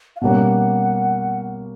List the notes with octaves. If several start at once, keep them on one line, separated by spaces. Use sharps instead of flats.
F5
B2 G3 A#3 C#4 F#5